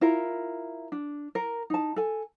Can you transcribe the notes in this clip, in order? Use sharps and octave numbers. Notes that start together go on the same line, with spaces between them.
E4 F4 A#4
D4
A#4
D#4 A5
A4 G#5